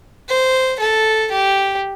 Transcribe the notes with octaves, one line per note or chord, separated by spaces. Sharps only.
C5
A4
G4